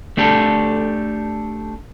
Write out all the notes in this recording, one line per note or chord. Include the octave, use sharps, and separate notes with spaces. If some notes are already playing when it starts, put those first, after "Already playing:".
A3 D4 G4 A4